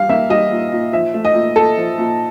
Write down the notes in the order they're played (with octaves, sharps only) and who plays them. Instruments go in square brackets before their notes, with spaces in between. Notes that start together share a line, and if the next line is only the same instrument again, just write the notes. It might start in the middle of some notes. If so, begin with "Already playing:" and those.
Already playing: [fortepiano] G3 [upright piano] F5
[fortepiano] A#3 [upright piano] E5
[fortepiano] G3 [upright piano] D#5
[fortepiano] A#2
A#2
[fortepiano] F3 [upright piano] E5
[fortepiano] A3
[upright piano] D#5
[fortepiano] A#2
[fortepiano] A#2 [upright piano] A4
[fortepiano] F3
A#2